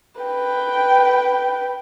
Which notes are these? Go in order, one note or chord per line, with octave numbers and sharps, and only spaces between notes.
B4 G5